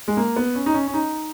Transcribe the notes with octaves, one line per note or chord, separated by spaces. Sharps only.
G#3
A#3
B3
C#4
D#4
C#4
C#4
D#4